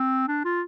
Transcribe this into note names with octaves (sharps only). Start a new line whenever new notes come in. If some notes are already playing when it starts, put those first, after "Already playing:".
Already playing: C4
D4
F4